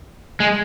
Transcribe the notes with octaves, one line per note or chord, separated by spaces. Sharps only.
G#3